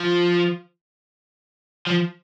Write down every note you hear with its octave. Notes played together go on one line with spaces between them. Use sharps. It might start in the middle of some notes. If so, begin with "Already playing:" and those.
Already playing: F3
F3